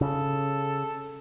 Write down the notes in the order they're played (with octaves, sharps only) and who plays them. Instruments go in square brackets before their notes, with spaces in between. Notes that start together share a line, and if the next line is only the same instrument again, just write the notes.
[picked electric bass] C#3 [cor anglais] A4